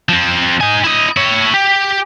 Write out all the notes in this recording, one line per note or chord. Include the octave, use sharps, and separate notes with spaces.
F3 C4
D#4 G#5
E4 D#5
E4 C#5
G4